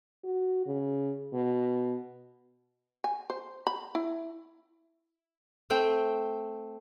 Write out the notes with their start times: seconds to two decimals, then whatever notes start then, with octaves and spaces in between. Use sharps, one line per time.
0.24 F#4
0.67 C#3
1.33 B2
3.04 G#5
3.30 C5
3.67 B5
3.95 E4
5.70 A3 C4 G5